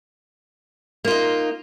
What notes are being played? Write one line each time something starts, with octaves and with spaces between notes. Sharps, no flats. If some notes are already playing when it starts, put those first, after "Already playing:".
A#3 D#4 F4